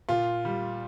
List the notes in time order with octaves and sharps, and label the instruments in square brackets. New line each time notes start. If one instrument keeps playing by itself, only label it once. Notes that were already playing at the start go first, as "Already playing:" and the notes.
[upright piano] A#2 F4
G3